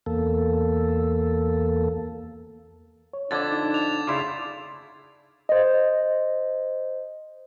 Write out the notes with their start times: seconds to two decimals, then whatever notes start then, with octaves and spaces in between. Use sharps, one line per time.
0.06 E2 A#3 A4
3.13 C#5
3.31 F2 D3 D4 D6 G#6 A6
3.52 D#4
3.74 F7
4.07 C#3 A3 E4 F4 D5 C6 D6
5.49 C5 D#5